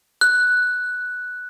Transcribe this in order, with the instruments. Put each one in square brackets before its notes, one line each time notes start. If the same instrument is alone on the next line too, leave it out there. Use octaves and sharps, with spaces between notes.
[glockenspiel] F#6